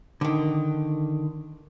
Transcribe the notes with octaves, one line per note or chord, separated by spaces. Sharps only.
D3 D#3